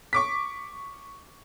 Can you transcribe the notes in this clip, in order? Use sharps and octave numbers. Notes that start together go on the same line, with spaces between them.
C#6 D6 B6